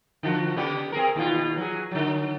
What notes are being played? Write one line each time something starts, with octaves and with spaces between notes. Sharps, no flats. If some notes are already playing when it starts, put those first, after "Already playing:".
D3 F3 F#4
C#3 B3 G4
C4 G#4 A#4
D#2 B2 F4
F#3 G#4
D3 F#3